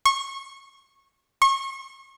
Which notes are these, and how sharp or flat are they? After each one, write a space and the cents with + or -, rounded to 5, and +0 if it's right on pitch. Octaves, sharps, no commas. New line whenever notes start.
C#6 -25
C#6 -35